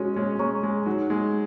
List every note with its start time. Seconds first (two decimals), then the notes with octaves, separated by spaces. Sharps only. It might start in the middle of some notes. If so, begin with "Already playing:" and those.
Already playing: G#3 C#4 F#4
0.16 G#3 C#4
0.39 G#3 C#4 C#5 A#5 C#6
0.63 G#3
0.86 F#3 D#4
1.10 G#3